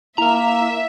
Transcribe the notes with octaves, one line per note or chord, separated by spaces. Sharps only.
A#3 E4 A#4 E5 A#5